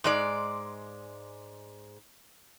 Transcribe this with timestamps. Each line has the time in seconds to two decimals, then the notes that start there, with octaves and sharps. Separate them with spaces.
0.04 G#2 G#3 D5